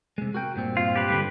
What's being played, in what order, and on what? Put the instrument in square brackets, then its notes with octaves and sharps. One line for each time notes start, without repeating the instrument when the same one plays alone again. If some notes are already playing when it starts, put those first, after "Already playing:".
[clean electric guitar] C3 G#3
F#4 A#4 G5
G2 A#2 C4
[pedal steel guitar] F4
G4 B4
[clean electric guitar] G2 D3